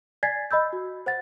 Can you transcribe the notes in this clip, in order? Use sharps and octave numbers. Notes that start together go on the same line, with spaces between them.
D5 G#5 G#6 A6 B6 C7
D#5 B5 E6 G6
F#4
C5 F#5 A6